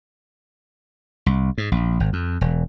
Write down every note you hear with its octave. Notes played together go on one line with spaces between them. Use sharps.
C2
G#2
A#1
G#1
F2
E1